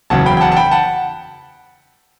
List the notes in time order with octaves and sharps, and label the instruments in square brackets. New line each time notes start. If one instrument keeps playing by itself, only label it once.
[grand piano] F#1 E2 C#3 F#3 F#5 A5
G5 B5
G5
F#5 A5
A5
G5 B5
F#5 A5